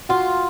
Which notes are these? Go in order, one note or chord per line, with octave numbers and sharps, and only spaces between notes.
F4 F#4